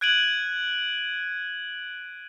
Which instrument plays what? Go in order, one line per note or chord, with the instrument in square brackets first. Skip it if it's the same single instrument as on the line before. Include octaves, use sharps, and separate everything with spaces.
[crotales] F#6 G#6 D7 D#7 F#7